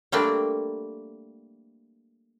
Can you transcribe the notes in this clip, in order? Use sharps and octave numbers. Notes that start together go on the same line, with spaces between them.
G3 A3 A#3 C4 D4